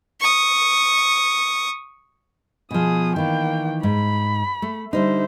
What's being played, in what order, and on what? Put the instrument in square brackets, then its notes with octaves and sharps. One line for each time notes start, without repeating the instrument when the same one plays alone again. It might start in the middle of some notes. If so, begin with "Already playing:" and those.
[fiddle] C#6 D#6
[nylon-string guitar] B2 F3 [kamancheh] G#4 D#6
[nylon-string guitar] D#3 E3 [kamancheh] A#3 G5
[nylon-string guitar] G#2 [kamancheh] B5
[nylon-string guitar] A3
[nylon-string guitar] D3 G3 D#4 [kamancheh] C5 E5